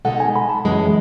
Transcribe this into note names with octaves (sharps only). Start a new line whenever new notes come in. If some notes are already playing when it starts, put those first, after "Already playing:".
B2 G#3 D#4 A4 F#5
G#5
B5
A5
F#2 E3 G#3